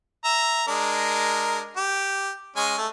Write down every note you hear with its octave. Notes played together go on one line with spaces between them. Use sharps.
E5 A#5 E6
G#3 D4 A#4
G4
G#3 C#4 G#5
A3